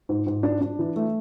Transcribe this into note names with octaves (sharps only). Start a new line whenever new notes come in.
G#2
G#2
D4
D4
E3
A3